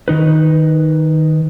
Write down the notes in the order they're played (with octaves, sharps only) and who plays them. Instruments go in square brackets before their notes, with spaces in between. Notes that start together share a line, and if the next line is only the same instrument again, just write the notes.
[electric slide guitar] D#3 D#4 B4